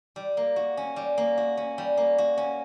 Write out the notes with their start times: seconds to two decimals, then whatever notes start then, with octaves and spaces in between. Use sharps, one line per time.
0.16 G3
0.37 A#3
0.56 F#4
0.77 C#4
0.96 G3
1.18 A#3
1.38 F#4
1.57 C#4
1.78 G3
1.97 A#3
2.18 F#4
2.37 C#4